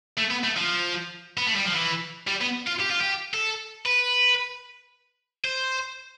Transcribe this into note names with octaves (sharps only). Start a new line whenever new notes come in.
A3
B3
A3
F3
B3
A3
G3
F3
E3
G3
B3
F4
G4
F4
G4
A4
B4
C5